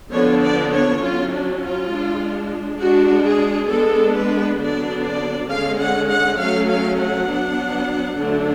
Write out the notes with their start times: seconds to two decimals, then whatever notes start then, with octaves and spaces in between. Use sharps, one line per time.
0.11 D3 F3 B3 D4 C#5
0.41 D5
0.71 C#5
1.01 F#3 C#4 F4
1.31 D4
1.61 F4
1.91 G#3 D4
2.80 G#3 D4 F#4
3.25 G#4
3.70 G#3 B3 D4 A4
4.14 B4
4.59 D3 F#3 B3 D4 D5
5.04 D5
5.49 D3 G#3 C#4 F5
5.79 F#5
6.09 F#5
6.38 F#3 A3 C#4 F5
6.69 F5
6.98 F#5
7.29 F#3 B3 D4
8.18 D3 F#3 A3 D4